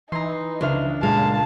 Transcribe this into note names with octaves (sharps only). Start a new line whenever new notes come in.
E3 D#4 A#5 C6
C#2 D4 C5 E5 F6
A#2 G#3 F5 A5